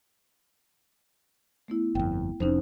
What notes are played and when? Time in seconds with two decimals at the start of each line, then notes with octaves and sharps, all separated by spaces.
1.68 A3 B3 E4
1.95 G1 F2 G5
2.40 F1 F2 C#4 D#4 C5